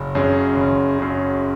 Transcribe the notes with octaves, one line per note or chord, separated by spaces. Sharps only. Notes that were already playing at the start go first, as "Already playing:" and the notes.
Already playing: F#1
F#2 C#3
F#1
F#2 C#3